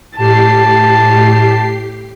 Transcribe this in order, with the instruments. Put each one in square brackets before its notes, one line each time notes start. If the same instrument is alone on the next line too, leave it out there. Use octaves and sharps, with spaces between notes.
[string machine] A2 G4 C7 [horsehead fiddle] A5